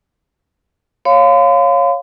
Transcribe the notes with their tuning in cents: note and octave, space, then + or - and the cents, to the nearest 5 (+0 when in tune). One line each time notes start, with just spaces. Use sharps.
C#5 -5 F5 +5 C6 -45